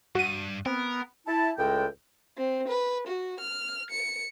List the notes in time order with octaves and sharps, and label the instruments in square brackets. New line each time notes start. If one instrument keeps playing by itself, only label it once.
[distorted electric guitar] G2 [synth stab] F#4 D#7
[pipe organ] B3 [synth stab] C4 [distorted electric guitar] A#4
[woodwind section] E4 A5
C#2 A2 G#3 A4 G5
[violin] C4
B4
F#4
F6
C#7